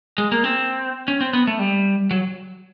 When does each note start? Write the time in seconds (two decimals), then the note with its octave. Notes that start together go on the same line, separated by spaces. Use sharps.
0.18 G#3
0.32 A#3
0.44 C4
1.08 C#4
1.21 C4
1.33 B3
1.47 A3
1.59 G3
2.11 F#3